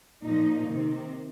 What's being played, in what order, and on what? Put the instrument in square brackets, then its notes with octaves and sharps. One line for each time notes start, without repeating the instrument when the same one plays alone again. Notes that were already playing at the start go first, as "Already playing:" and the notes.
[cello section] A#2 F3 A#3 D#4
C3 D#3 C4